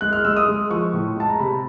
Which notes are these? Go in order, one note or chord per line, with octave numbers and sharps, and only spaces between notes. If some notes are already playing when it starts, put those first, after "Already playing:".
G#3 F#6
F6
G#3 E6
D#6
G#3
F3 C#6
A2
G#3 A5
A#5
C3 B5